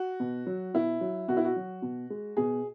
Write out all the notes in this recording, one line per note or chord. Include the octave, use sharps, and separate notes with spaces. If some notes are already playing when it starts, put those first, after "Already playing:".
Already playing: F#4
B2
F#3
B2 E4
F#3
B2 F#4
E4
F#4
F#3
B2
G#3
B2 G#4